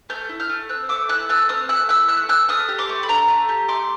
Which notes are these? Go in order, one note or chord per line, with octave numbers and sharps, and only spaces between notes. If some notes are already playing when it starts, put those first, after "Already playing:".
A3 F6 G6
E4
F6 G6
A3
C4 E6 F#6
A3 D6 E6
E4 E6 F#6
A3 E6 F#6
C4 D#6 F6
A3 E6 F#6
E4 E6 F#6
A3 E6 F#6
C4 E6 F#6
A3 D#6 F6
G4
C6 D6
A3
B5
D4 A#5 C6
A3
G4
A3 C6 D6